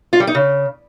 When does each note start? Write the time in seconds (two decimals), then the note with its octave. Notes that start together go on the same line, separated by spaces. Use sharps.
0.13 F4
0.20 G3
0.27 D#4
0.35 C#3